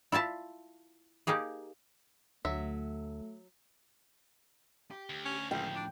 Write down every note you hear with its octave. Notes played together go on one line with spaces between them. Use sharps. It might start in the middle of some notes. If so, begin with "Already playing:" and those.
E4 F4 E5 A5
A#3 D#4 G4 G#4
D2 F#3 A3 E5
G4
D2
C#4
C#2 A2 F3 G5
D4